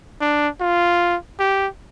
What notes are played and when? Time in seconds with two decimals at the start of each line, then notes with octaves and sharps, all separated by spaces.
0.21 D4
0.61 F4
1.40 G4